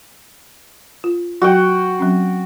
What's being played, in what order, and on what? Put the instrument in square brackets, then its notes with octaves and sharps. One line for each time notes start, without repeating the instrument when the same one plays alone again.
[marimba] F4
[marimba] F#3 [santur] F#4 F#5 G5
[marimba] F#3 C4 C#4